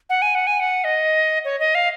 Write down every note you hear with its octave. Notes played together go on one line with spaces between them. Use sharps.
F#5
G#5
F#5
G#5
F#5
D#5
C#5
D#5
F5